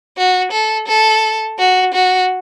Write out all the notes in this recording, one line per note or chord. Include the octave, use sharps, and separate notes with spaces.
F#4
A4
A4
F#4
F#4